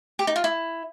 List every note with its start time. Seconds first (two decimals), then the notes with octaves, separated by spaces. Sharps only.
0.19 G4
0.27 D#4
0.36 F4
0.44 E4